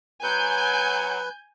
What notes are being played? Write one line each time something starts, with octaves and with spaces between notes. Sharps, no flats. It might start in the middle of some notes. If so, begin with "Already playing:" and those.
F#3 B4 G#5 G6